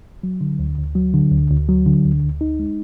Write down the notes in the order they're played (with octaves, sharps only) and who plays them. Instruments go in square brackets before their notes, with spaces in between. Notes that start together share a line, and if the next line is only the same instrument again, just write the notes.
[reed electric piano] F#3
D3
D2
D2
F#3
D3
D2
D2
F#3
D3
D2
D2
D#4
G#3